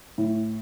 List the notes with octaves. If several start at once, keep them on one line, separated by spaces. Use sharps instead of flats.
A2